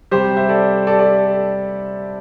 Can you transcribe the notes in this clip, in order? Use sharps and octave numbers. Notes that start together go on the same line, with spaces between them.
C3 G3 G4 C5
C5 E5
A4 D5
A4 D5
A4 D5